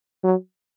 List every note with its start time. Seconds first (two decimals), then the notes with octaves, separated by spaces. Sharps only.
0.24 F#3